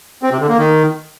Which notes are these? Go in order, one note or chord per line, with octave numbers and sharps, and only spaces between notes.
C4
C3
D3
A#3
D#3